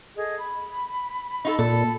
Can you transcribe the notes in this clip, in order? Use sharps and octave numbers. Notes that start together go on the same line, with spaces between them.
G#4 A4 D#5
B5
D#4 F4 A4
A#2 A4